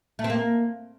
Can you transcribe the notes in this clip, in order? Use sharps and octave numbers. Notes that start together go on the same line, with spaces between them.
A3
C4
A#3